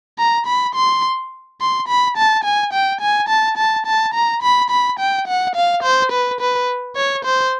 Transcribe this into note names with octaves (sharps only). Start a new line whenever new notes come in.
A#5
B5
C6
C6
B5
A5
G#5
G5
G#5
A5
A5
A5
A#5
B5
B5
G5
F#5
F5
C5
B4
B4
C#5
C5